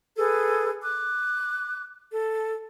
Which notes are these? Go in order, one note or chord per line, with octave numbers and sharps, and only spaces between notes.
G#4 A4 B4
D6 F#6
A4